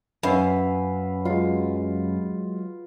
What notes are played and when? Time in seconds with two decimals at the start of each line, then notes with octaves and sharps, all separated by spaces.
0.23 F#2 C#4 B4 E5 F5
1.25 F#3 G#3 F4